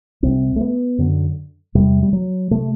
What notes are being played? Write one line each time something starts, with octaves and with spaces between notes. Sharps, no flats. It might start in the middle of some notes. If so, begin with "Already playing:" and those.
C2 C3 C4
A3
B3
F#2 D3
E2 C3 G3
G3
F#3
C3 A3